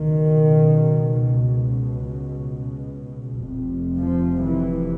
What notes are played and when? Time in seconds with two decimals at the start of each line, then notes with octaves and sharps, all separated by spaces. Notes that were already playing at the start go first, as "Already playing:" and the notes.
Already playing: C#2 B2 D#3
3.49 F1 F2 C3
3.96 F3
4.43 E3